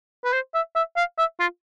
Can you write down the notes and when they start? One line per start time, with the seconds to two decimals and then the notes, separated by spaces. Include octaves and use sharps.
0.24 B4
0.33 C5
0.54 E5
0.75 E5
0.97 F5
1.18 E5
1.40 F4